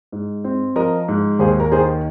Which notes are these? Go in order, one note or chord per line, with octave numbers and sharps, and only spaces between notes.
G#2
C4
F3 A#4 D#5
G#2
D#2 G#4 C5
A#4
D#3 G#4 C5